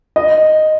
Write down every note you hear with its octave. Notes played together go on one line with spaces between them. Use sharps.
D#5